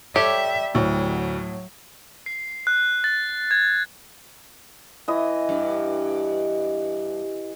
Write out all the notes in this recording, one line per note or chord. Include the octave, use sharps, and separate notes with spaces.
G3 G4 A4 C#5 E5
D2 A2 F#3
C7
F#6
A6
G#6
E3 D#5
G2